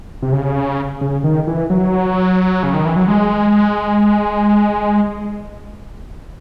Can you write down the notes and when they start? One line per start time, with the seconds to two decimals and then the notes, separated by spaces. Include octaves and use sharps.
0.22 C3
0.33 C#3
1.01 C#3
1.24 D#3
1.47 E3
1.70 F#3
2.63 C#3
2.74 D#3
2.85 E3
2.96 F#3
3.08 G#3